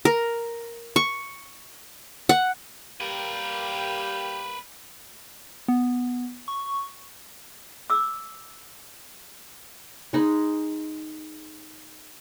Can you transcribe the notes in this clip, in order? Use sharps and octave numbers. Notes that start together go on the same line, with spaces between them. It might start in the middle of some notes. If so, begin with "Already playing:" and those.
A#4
C#6
F#5
G3 A#3 G4 A#4 B4
B3
C#6
D6 E6
G#3 D#4 B5